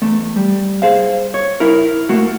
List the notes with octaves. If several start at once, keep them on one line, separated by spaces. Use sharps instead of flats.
E2 A3
G3
G#4 C5 F5
C#5
E4 A#4
A3 A#3 F#4